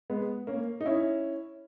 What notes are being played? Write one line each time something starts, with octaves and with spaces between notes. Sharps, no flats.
G#3 B3
A#3 C#4
D#4
C#4 E4